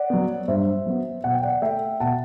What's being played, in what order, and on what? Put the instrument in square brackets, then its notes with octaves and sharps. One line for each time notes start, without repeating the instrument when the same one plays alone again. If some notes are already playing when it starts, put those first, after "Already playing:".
Already playing: [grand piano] D5 F#5
F#3 B3
G2 C5 E5
F#3 B3
B2 F#5
G5
D5 F#5
A3 E5 G5
B2 F#5 A5